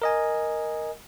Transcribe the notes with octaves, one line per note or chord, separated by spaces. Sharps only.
A#4 D#5 G#5